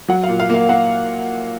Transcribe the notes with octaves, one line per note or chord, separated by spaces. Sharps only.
F#3 F#5
F5
A#2
F5
A#3 F5
A#3 F#5